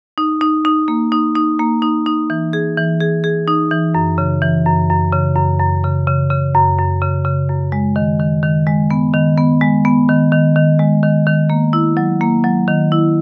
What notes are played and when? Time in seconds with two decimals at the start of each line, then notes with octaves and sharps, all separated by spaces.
0.18 D#4
0.41 D#4
0.65 D#4
0.88 A#3
1.12 D#4
1.35 D#4
1.59 A#3
1.82 D#4
2.06 D#4
2.30 E3
2.53 G#4
2.77 E3
3.00 G#4
3.24 G#4
3.48 D#4
3.71 E3
3.95 F#2
4.18 C#3
4.42 E3
4.66 F#2
4.90 F#2
5.13 C#3
5.36 F#2
5.60 F#2
5.84 C#3
6.07 C#3
6.31 C#3
6.55 F#2
6.78 F#2
7.01 C#3
7.25 C#3
7.49 F#2
7.72 G#3
7.96 D#3
8.20 D#3
8.43 D#3
8.67 G#3
8.91 B3
9.14 D#3
9.38 B3
9.61 G#3
9.85 B3
10.09 D#3
10.32 D#3
10.56 D#3
10.79 G#3
11.03 D#3
11.27 D#3
11.50 A#3
11.73 E4
11.97 F#3
12.21 A#3
12.44 F#3
12.68 D#3
12.92 E4